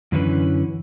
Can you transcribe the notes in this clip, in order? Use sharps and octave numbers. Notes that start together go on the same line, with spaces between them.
F#2 D3 E3 C#4 B4